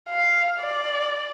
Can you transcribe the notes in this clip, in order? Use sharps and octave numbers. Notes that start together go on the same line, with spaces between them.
F5
D5